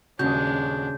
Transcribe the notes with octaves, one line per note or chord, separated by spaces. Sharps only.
D#1 C#3 G#3 D4 F#4 G6